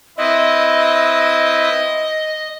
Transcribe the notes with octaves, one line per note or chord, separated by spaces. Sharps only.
C4 E4 B4 D#5